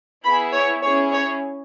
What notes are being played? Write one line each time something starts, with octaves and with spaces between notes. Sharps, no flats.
B3 E4 G#4 B5
C#5
C#4 E4 G#4 C#5
C#5